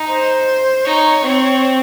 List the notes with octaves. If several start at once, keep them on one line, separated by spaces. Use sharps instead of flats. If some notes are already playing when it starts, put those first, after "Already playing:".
Already playing: D#4
C5
D#4 C#5
C4